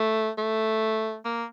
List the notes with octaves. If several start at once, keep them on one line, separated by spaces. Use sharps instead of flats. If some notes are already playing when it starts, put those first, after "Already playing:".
Already playing: A3
A3
A#3